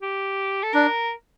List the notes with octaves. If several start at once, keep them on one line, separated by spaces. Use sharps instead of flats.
G4
A4
D4 A#4